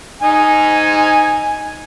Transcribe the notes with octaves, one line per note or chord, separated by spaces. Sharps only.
D#4 G#5